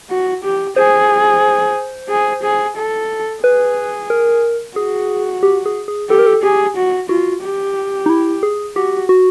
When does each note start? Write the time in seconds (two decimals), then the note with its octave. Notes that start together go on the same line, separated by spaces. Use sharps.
0.10 F#4
0.44 G4
0.76 G#4 C5
2.09 G#4
2.43 G#4
2.77 A4
3.43 G#4 B4
4.10 A#4
4.76 F#4 G#4
5.43 G4
5.66 G#4
5.88 G#4
6.10 G4 A4
6.19 A#4
6.27 A4
6.43 G4 G#4
6.76 F#4
7.09 F4 F#4
7.43 G4
8.06 D#4
8.09 E4
8.43 G#4
8.76 F#4 G4
9.09 F#4